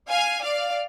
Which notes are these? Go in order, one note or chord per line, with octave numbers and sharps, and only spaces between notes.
F5 G#5
D5 F5